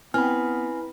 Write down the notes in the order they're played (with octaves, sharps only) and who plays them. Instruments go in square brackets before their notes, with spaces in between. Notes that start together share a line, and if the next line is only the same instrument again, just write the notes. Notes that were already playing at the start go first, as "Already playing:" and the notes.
[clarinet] B3 [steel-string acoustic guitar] C4 [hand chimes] E4 B4 B5 [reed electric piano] G#5 F6